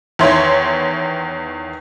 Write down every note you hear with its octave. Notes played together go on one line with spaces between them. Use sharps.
E2 D#3 E4 C#5 C6